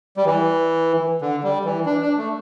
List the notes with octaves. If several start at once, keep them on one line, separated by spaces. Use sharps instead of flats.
G3
E3
D3
G3
E3
D4
D4
A3